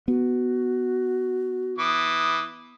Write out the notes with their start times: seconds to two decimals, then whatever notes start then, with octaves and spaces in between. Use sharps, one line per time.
0.08 B3 F#4
1.78 E3 D6 D#6